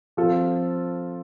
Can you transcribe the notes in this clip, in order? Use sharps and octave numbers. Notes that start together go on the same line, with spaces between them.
F3 C4 F4 A4